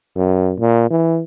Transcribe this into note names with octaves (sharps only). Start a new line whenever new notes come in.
F#2
A#2
E3